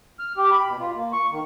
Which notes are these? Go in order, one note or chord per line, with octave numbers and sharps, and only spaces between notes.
F6
G4
B5
B2
F4
A#3
C#6
D#3